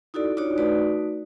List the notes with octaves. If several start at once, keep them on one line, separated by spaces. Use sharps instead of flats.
D#4 E4 F#4 A4 D5
D4 D#4 F4 F#4 C#5 D5
A3 D#4 F#4 B4 D5